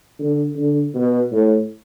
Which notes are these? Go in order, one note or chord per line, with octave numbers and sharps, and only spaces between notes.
D3
D3
B2
A2